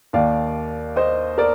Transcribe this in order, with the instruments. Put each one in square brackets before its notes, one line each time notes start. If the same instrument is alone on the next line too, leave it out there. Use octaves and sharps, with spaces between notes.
[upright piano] D#2 D#3 D5 F5
C5 D#5
A#4 D5